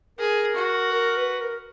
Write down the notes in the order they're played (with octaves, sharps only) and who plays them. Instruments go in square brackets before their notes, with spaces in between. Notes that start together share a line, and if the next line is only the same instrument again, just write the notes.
[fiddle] G#4 [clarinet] A#4
[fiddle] F#4
[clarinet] A#4
B4
A#4